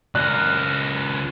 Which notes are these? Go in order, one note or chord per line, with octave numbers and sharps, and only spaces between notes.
C#2 A#4 F#6